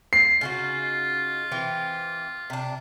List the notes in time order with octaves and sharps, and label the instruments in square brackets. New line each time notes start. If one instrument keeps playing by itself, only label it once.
[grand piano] C7
[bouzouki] C#3 D#4 F#4 [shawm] F4
[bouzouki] E3 C4 G4
C3 D4